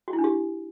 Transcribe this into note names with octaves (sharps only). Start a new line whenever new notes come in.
F#4
E4
D4
G4